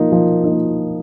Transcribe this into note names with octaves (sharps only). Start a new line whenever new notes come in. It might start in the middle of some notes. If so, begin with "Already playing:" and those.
Already playing: F3 A#3 D#4
F3
A#3 D#4